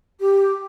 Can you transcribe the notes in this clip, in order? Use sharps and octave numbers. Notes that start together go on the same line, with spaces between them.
G4